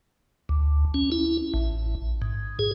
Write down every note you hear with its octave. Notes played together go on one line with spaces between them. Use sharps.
D2
C#4
E4
A1
G#2
G#4